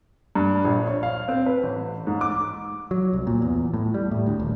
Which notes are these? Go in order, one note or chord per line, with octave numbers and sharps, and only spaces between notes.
G2
A#1
C#5
F5
C4
B4
A1
G#2
D6
F#3
C2
A#2
E2
A2
G3
A2
D2
D#1